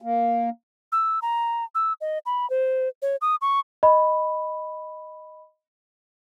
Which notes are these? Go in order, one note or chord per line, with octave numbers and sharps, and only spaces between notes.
A#3
E6
A#5
E6
D#5
B5
C5
C#5
D#6
C#6
D#5 B5